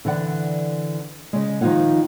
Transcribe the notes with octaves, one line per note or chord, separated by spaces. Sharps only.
D3 E3 D5 F#5
C#3 G#3
D#3 F3 D#4 F4 C#5 F#5